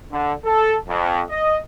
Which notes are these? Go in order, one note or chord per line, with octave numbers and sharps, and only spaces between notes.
D3
A4
F2
D#5